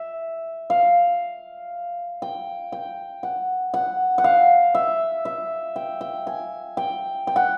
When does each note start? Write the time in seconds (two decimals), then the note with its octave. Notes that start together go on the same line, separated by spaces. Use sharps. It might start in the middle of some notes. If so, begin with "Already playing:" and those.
Already playing: E5
0.70 F5
2.22 G5
2.72 G5
3.23 F#5
3.74 F#5
4.18 F#5
4.24 F5
4.75 E5
5.25 E5
5.76 G5
6.01 G5
6.27 G#5
6.77 G5
7.27 G5
7.36 F#5